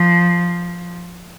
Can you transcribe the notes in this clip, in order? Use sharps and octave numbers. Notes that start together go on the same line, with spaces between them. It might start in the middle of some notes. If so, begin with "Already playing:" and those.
Already playing: F3